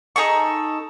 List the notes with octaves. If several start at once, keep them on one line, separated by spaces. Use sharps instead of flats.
D#4 G#4 A4 C#6